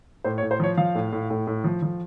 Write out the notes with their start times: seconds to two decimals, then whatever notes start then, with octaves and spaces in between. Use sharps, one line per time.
0.24 A2 C5
0.38 C#5
0.43 A2
0.51 C5
0.60 F3 C#5
0.77 F3 F5
0.95 A2
1.13 A2
1.30 A2
1.47 A2
1.64 F3
1.82 F3